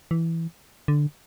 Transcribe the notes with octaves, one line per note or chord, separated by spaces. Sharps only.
E3
D3